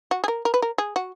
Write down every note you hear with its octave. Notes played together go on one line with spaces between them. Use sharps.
F#4
G#4
A#4
A#4
B4
A#4
G#4
F#4